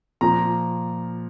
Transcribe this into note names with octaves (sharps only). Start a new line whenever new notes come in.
A#2 F3 A#5